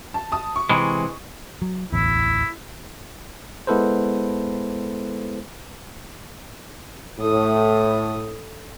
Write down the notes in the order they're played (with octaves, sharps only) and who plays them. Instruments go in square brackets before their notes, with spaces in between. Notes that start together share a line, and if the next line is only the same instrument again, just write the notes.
[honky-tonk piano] A5
A5 D#6
C#6
[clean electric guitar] C3 E3 G#3
[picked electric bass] F#3
[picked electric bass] D1 A1 E2 [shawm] E4
[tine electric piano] G#3 B3 E4 A4 B4 C5
[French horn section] A2 [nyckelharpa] A4 D#6